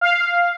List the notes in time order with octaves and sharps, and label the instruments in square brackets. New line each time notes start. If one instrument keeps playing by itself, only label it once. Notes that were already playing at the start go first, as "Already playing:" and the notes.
[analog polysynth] F5